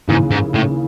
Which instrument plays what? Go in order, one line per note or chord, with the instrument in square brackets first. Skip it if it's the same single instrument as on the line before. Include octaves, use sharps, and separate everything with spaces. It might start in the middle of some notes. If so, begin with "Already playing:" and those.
[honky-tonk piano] D#2 C#3 E3 [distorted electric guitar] G#2
[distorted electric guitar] G#2
A2